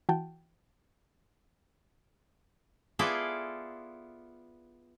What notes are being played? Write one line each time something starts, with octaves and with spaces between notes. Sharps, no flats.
E3 F#4 G5 A5
B3 E4 F4 G#4 A4 D5